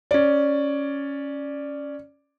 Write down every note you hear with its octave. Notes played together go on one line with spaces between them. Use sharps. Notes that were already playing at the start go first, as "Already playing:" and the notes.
C#4 D5